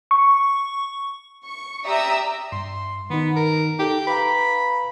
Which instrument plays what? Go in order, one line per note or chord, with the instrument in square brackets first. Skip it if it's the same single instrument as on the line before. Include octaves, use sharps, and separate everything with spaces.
[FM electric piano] C#6
[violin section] C#6
G4 D5 E5 A#5 D#6 E6
[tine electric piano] G2 [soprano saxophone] C6
[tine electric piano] D#3 D#4 [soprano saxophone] B3
[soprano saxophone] A#4
[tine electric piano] D#4 A4 [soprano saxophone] G4
[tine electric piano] B4 F5 A#5 [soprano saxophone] B5